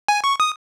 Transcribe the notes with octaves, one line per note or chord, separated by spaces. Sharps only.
G#5
C#6
D#6